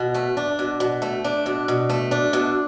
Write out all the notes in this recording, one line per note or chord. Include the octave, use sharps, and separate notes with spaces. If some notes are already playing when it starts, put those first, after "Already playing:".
Already playing: B2
A3
D4
B2
B2
A3
D4
B2
B2
A3
D4
B2